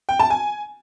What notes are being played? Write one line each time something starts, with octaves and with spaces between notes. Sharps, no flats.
G5
A5
G#5